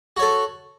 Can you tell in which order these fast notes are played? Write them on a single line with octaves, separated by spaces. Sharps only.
F#4 C#5 A4